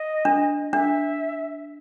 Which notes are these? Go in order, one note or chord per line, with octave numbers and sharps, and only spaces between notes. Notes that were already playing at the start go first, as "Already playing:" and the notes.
Already playing: D#5
D4
D4 E5